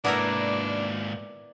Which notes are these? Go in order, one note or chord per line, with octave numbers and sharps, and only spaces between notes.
G#2 A#3 B3 D4 E4 A#4 D5